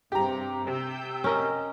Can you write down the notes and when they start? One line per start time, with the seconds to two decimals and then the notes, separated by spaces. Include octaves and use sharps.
0.12 G2 C3 G4 A#5
0.67 C3 G5 E6 G6
1.24 C#4 A#4 D#5